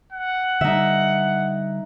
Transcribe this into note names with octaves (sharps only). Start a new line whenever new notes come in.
F#5
D3 G3 D#4 E5